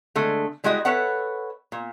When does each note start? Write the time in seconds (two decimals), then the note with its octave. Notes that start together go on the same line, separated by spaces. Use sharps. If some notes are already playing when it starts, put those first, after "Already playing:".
0.15 D3 G#3 A3
0.64 G3 G#3 E4 F#4 D#5
0.85 A4 B4 C#5 E5 F#5
1.72 A#2